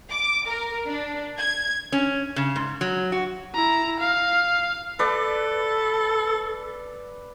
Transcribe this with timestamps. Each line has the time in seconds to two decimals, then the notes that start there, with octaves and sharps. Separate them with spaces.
0.10 D6
0.47 A#4
0.86 D4
1.38 G#6
1.92 C#4
2.36 C#3
2.56 G#2
2.81 F#3
3.12 F#4
3.54 E4 A#5
4.00 F5
4.99 A4 B4 D5